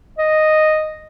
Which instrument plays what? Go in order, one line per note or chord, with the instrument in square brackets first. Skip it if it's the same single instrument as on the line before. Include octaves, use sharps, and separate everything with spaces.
[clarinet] D#5